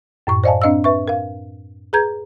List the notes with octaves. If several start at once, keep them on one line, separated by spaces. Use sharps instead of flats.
F#2 A2 C#6
C5 D5 D#5 F5 G#5 A5
C4 D4 D#5 F5 E6
B4 E5 C#6
A#4 F5
G#4 B4 A#5 G6 G#6